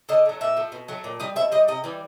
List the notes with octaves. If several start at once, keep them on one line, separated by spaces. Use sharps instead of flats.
D3 D#5
F#3 A3
A#2 E5
F3 A3
B2
F#3 A3
A#2
G3 D#5
B2 E5
G3 D#5
C3 D#5
E3 G3